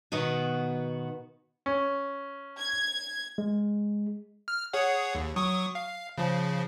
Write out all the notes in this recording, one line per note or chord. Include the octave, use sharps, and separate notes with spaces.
B2 D#3 B3 F#4
C#4
G#6
G#3
F6
G#4 C#5 F#5
D#2
F#3 C#6 D#6
F5
C#3 F3